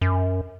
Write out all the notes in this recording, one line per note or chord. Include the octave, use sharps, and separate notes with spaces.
F#2